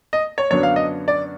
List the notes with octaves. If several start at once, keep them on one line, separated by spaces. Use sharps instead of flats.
D#5
C#5
F#2 D3 F#3 B3 D4 C#5
F5
D#5
D5